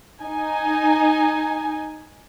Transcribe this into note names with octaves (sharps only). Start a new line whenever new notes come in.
D#4 G#5